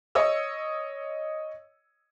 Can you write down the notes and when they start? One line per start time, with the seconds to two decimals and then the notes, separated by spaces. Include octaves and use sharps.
0.15 C#5 D#5 E6